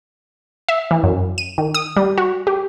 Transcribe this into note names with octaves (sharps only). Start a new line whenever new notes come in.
E5
E3
F#2
D#7
D#3
D#6
G3
F#4
G4